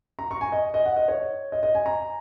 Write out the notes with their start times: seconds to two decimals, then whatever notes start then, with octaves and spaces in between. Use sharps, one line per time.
0.19 A#5
0.31 C#6
0.41 G#5
0.52 D#5
0.74 D#5
0.86 F#5
0.96 D#5
1.08 C#5
1.52 D#5
1.63 D#5
1.75 G#5
1.86 A#5